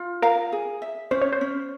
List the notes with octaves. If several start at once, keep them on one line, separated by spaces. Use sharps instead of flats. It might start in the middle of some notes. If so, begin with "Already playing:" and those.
Already playing: F4
A#4 F5
G#4
E5
C#4 C5
C#5
C5
C#4